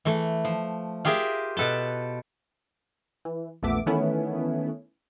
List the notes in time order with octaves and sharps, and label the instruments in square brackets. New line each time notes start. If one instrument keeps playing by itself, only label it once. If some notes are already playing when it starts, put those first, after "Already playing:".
[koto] E3 A3
F3
F4 G4 G#4 A#4 E5
B2 A4 B4 A5
[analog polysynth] E3
A#1 E2 A3 B3 E5 D6
D#3 E3 A3 B3 C#4 E4